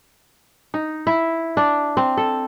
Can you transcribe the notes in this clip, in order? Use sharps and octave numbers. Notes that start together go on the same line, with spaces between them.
D#4
E4
D4
C4
A4